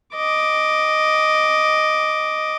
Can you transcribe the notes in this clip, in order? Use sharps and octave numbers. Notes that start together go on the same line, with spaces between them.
D#5 D6